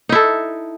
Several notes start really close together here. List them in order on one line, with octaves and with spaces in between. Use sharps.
D#4 E4 A4